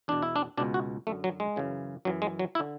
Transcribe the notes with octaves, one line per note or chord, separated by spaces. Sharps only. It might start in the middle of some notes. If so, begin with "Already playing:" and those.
E2 B2 D4
E4
D4
C#2 B2 D4
F#4
F#2 D3 A3
F#3
G#3
F#2 C#3 E3
F#2 E3 F#3
G#3
F#3
E4
D3